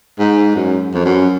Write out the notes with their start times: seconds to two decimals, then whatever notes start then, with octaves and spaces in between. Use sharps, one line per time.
0.19 G#2
0.56 F#2
0.94 F2
1.05 F#2